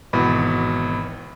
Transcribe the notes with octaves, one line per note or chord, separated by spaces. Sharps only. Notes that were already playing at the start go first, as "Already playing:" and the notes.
G#1 B2 E3 B5